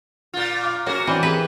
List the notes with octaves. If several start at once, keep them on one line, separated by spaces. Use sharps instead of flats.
A#2 F4
F5 D6
A#3 C#4 F#4 A#4
E3 C4 D4
G4 G#4 B4